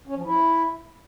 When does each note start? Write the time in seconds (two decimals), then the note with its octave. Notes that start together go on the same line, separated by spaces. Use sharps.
0.07 C#4
0.16 F3
0.25 E4